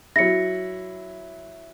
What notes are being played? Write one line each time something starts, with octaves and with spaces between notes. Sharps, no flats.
F#3 E4 A#6 C#7